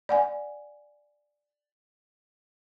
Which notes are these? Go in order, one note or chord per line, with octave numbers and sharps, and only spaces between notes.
D5 F#5 G#5